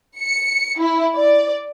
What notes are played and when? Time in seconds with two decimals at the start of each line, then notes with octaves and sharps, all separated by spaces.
0.20 C#7
0.80 E4
1.16 D5